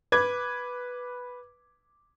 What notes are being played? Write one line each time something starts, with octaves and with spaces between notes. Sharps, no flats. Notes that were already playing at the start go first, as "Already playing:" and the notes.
B4 D6 G#6